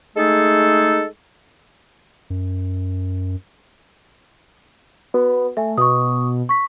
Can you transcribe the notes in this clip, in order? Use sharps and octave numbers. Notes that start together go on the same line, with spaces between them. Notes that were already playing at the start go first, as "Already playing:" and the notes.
G#3 A3 D#4 G#4 A4
F#2
B3 F#4
A3 E5 G#5
B2 C#6 D#6
C#6 B6